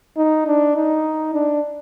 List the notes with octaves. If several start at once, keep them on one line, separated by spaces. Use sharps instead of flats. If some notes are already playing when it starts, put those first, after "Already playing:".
D#4
D4
D#4
D4